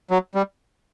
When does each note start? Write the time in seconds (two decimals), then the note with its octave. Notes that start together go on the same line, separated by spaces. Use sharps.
0.11 F#3
0.35 G3